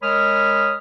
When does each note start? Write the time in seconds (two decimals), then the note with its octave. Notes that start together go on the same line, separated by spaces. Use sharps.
0.03 G#3 A#4 C#5 B5 D#6 F6